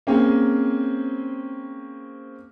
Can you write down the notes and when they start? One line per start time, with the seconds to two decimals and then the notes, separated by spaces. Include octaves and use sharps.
0.07 A#3 C4 C#4 G#4